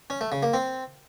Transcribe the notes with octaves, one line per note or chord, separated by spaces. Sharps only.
C#4
A3
C#3
A#3
C4